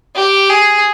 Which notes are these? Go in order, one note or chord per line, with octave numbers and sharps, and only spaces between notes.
G4
G#4